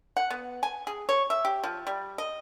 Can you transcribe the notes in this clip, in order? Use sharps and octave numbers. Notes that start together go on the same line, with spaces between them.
F#5
B3
G#5
G#4
C#5
E5
G4
F3
G3
D#5